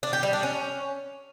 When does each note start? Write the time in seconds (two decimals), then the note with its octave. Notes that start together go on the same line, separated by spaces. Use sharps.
0.03 D4
0.13 G4
0.23 G3
0.33 D4
0.43 C#4